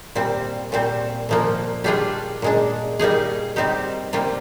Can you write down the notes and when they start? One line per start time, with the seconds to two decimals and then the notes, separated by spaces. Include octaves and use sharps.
0.15 A#2 G3 C4
0.72 A#2 G3 C4
1.29 A#2 F3 A#3
1.84 G3 D4 F4 G#4
2.42 A#2 G#3 D4
2.99 G3 A#3 D#4 G#4
3.56 G3 C4 D#4 G4
4.13 C3 G3 A#3 F4